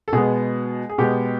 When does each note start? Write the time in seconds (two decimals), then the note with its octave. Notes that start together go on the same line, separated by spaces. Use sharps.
0.08 A4
0.13 B2 G#3 B3 G#4
0.89 G#4
0.98 B2 G#3 B3 G4